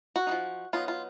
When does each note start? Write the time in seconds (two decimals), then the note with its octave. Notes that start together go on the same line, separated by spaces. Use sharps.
0.16 F#4
0.27 G#3 D#4
0.31 F3
0.73 F#3 B3 D#4 F4
0.88 F4